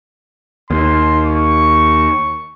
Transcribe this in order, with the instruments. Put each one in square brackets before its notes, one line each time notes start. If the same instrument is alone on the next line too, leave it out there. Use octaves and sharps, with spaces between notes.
[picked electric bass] D#2 [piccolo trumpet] C6
[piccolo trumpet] C#6